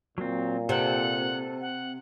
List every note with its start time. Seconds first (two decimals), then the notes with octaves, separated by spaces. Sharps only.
0.18 A#2 F#3 C4
0.69 C3 A4 F#5
1.61 F#5